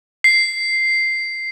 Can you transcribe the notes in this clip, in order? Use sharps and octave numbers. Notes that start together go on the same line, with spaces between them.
C7